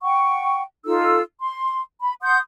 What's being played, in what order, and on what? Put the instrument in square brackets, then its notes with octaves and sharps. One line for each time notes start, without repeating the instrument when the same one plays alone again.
[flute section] F#5 G5 C#6
D#4 F4 A4 E6
C6
B5
F#5 C6 D#6 G6